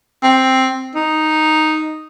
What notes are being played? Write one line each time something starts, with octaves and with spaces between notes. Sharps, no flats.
C4
D#4